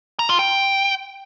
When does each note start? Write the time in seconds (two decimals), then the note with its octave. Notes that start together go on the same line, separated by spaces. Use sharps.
0.19 A#5
0.29 F4
0.39 G5